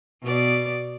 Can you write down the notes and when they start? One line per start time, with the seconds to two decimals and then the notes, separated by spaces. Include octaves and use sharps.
0.23 B2 B3 D5